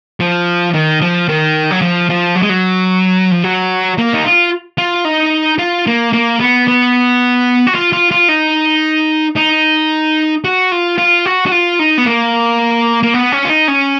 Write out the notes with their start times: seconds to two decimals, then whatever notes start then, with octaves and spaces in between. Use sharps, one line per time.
0.20 F3
0.73 D#3
1.01 F3
1.29 D#3
1.71 F#3
1.82 F3
2.09 F3
2.35 F#3
2.42 G#3
2.49 F#3
3.31 F3
3.44 F#3
3.98 A#3
4.14 D#4
4.24 F4
4.78 F4
5.05 D#4
5.59 F4
5.87 A#3
6.13 A#3
6.40 B3
6.68 B3
7.67 F#4
7.75 F4
7.93 F4
8.11 F4
8.29 D#4
9.36 D#4
10.45 F#4
10.72 F4
10.98 F4
11.25 F#4
11.46 F#4
11.52 F4
11.79 D#4
11.98 B3
12.06 A#3
13.03 A#3
13.14 B3
13.32 C#4
13.45 F4
13.49 D#4
13.68 C#4